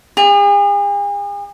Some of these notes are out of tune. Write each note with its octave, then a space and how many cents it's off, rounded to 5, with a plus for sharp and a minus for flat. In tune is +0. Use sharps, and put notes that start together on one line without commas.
G#4 -45